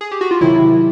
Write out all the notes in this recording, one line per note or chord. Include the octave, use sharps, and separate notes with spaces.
G#4
G4
F#4
F4
C3 D#3 F#3 E4